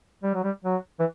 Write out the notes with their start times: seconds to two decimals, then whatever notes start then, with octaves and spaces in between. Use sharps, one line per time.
0.23 G3
0.34 F#3
0.44 G3
0.64 F#3
0.99 E3